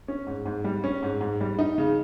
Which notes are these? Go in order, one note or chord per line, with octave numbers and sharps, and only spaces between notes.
C#4
G#2
G#2
G3
C#4
G#2
G#2
G3
D#4
C#3